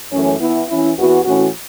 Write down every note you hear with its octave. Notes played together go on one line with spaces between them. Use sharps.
F#2 E3 A3 C#4
E3 B3 E4
E3 C#4 E4
E2 E3 B3 F#4
A2 E3 C#4 F#4